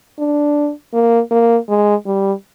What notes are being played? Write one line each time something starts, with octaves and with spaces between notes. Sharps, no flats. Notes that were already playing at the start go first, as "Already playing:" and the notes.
D4
A#3
A#3
G#3
G3